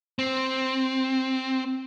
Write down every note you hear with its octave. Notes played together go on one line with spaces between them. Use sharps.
C4